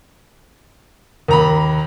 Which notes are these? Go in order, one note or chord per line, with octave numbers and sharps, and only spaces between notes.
D#2 A#4 A#5 B5